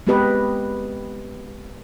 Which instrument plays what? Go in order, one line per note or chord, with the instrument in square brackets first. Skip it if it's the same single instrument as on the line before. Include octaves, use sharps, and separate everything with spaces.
[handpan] G#3 B3 C4 G4 B4 D#5